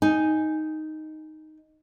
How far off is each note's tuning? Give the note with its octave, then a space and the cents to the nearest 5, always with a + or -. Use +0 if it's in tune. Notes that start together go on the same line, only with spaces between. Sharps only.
D#4 +0 G#5 +0